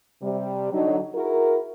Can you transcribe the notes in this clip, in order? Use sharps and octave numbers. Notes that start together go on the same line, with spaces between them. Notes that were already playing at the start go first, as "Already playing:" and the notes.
C3 G3
D3 F#3 D#4
E4 F#4 G#4 A#4